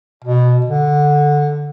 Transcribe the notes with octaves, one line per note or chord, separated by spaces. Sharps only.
B2
D3